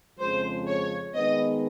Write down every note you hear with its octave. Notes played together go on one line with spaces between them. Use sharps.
F2 C#3 F3 G#3 C5
C#5
D#3 G#3 B3 D#5